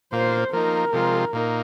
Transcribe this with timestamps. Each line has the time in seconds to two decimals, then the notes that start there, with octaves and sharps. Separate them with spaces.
0.12 A#2 A#3 F4 C5
0.52 F3 A#3 D#4 A#4
0.93 C3 F3 G#3 F4
1.33 A#2 A#3 D#4